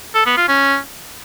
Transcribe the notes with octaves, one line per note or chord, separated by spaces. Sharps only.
A4
B3
F4
C#4